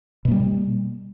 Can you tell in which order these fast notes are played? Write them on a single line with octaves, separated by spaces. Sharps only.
B2 A#3 G3